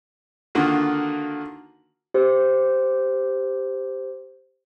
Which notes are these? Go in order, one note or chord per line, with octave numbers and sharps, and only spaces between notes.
D3 D#3 A#3 F4 F#4
G4 C5